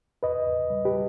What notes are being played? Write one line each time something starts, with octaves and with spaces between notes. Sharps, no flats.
E2 B4 D#5
E2
G3
G4 B4
G3